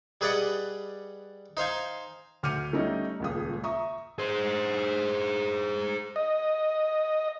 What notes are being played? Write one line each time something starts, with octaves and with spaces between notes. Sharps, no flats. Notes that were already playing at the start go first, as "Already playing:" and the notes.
G3 G#4 B4 D5 D#5 F#5
D#4 C5 F5 G#5
D2 D6 F6 G6 C#7 D#7
G3 A3 C#4 D#4
D#1 C#2 D#6
E5 A#5 C#6 D#6
G#4 C5
D#5